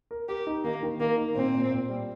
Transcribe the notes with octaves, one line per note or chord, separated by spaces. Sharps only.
A#4
G4 A#4
D#4
D#3 A#3
D#3
D#3 A#3
D#4
A#2 C4
A#2
A#2
G3